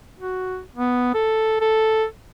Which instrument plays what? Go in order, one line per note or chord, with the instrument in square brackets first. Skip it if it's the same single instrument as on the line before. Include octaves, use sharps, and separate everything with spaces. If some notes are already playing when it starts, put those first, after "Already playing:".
[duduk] F#4
B3
A4
A4